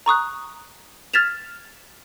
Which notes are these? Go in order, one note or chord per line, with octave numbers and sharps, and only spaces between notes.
A#5 C#6 D#6 F#6
F6 G#6 A6 B6 E7 F7